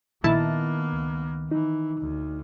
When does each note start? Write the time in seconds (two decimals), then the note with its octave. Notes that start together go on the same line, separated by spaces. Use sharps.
0.24 A#1 D#3 A#3 B3 E4 A5
0.93 C#2
1.51 E3 D#4
2.00 D2